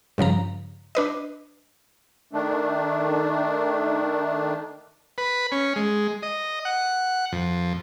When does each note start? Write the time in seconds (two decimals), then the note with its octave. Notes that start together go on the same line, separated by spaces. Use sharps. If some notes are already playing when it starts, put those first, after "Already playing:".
0.18 G2 C#3 F3 A#5
0.95 D4 B4 D#5
2.33 D#3 A3 D4
5.18 B4
5.52 C#4
5.76 G#3
6.23 D#5
6.65 F#5
7.32 F2